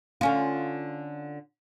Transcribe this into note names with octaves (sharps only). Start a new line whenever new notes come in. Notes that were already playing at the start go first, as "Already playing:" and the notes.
D3 C#4 F4